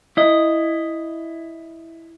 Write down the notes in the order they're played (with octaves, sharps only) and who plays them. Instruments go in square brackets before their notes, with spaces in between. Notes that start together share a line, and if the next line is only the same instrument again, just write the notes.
[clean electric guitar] E4 D#5